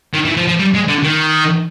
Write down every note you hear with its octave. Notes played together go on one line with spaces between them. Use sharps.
D#3
E3
F3
F3
G3
G#3
D3
D#3